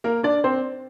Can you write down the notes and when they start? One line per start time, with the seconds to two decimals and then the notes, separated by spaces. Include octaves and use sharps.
0.04 A#3 A#4
0.23 D4 D5
0.44 C4 C5